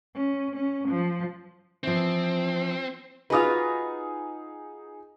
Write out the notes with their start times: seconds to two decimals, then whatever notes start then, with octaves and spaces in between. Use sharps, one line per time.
0.15 C#4
0.56 C#4
0.89 F3
1.84 E3 F3 C4
3.30 D#4 F4 F#4 G#4 B4 D#6